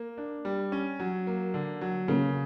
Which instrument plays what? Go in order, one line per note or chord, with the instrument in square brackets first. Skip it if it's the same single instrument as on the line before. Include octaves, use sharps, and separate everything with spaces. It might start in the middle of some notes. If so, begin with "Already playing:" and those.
Already playing: [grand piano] A#3
D4
G3
C#4
F#3
A#3
D3
F#3
[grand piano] C#3 [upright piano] A#3 C#4